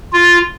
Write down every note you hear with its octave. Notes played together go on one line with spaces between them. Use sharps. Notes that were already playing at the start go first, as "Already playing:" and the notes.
F4